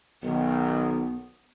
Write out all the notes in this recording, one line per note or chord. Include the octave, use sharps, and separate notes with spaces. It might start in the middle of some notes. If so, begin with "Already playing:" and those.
B1 D#3 B3